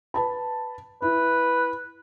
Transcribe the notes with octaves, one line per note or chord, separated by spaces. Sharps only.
B4 A5 B5
E4 B4